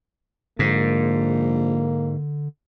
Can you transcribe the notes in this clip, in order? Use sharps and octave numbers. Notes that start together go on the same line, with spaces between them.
A#1 G#2 D3 A#3